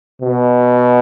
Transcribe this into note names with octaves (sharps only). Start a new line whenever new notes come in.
B2